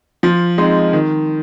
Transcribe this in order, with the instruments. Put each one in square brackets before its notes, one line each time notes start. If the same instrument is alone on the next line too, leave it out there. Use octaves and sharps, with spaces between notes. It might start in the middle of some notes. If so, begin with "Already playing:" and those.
[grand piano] F3
G#3 C4 D#4
D#3